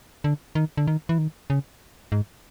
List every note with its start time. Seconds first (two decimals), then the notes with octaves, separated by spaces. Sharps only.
0.24 D3
0.55 D#3
0.77 D3
0.88 D#3
1.09 E3
1.18 D#3
1.50 C#3
2.12 G#2